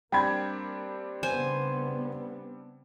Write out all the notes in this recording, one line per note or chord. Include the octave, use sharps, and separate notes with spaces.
G3 A#3 C4 D4 G5 B5 G#6
C#3 B3 C5 G#5